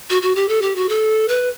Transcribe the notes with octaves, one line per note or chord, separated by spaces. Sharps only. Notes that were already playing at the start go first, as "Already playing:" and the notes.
F#4
F#4
G4
A4
G4
F#4
A4
B4